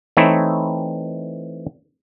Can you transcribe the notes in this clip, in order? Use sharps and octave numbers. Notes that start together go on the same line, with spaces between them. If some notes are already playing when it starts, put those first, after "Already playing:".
E3 A3 C4 D#4 E4 C#5